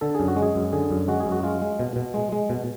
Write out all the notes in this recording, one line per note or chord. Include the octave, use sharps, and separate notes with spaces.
D3 A4
F#2 G#4
F#4
G#3
G#4
F#2
D3 G#4
F#2
G#3 F#4
G#4
F#2
F#4
G#3 F4
G#3
B2
B2
G#3
G#3
B2